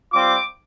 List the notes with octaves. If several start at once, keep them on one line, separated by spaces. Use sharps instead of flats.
G3 C4 F4 D6